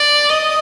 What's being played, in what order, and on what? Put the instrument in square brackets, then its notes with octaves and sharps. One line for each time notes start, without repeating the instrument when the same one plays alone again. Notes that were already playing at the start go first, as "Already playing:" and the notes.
Already playing: [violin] D5
D#5